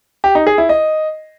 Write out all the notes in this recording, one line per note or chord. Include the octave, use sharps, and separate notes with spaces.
G4
D#4
G#4
E4
D#5